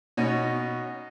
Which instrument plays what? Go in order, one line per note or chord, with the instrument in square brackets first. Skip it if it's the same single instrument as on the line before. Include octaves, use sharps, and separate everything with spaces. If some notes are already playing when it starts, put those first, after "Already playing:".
[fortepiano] B2 C#4 D#4